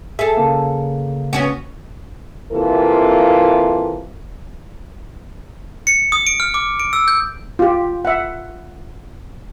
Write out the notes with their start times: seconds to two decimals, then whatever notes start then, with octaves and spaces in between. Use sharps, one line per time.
0.19 G#4 A4 E5
0.37 C#3 A#3
1.33 B3 C#4 F#4
2.52 C3 E3 A#3 F4 A4
5.87 C#7
6.12 D#6
6.27 D7
6.40 F6
6.54 D6
6.80 D7
6.93 E6
7.08 G6
7.59 F4 G4
8.05 E5 F#5